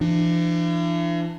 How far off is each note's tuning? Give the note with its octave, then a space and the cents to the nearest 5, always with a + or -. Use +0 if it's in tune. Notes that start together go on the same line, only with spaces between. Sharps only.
E3 +45 D4 +25